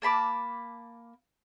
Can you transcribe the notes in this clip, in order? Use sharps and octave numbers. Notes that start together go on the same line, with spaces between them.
A#3 A5 B5 D6